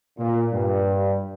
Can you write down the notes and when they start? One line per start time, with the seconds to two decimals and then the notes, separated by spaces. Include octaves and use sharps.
0.17 A#2
0.52 G2